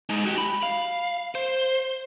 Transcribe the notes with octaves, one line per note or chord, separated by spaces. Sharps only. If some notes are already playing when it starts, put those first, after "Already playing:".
G#3 D#4
F#4 G4
B5
F5
C5